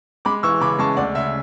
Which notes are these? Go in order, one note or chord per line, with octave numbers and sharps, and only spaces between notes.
G#3 B5 D6
E3 C#6 E6
C#3 B5 D6
G#3 A5 C#6
D2 D5 F#5
C#3 E5